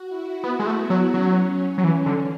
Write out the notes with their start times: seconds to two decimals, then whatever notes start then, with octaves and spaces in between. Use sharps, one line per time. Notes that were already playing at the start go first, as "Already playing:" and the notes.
Already playing: F#4
0.09 E4
0.43 B3 E4
0.59 G#3
0.67 A3
0.79 B3
0.90 F#3
1.14 F#3 C#4
1.78 F#3
1.84 E3
2.06 D3